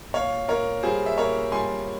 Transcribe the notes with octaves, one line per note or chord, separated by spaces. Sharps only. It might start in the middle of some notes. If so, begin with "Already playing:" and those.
A#2 C#5 F5
A#2 A#4 C#5
G3 G#4 C5
E5
A#2 A#4 C#5
G3 G#5 C6